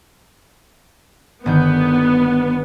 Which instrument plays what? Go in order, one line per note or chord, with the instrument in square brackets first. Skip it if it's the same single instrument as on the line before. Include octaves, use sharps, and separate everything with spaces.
[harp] G1 D#3 G6 [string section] B3